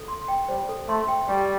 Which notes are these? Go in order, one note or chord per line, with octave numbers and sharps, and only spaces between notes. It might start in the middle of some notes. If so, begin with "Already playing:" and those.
Already playing: A4
C6
G5
G3 C5
A4
A3 C6
G5
G3 G4